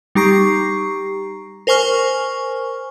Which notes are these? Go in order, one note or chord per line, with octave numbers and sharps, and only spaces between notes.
G3 D#4 G4 A#5 C#6 C7
A#4 C5 G#5 C#6 F6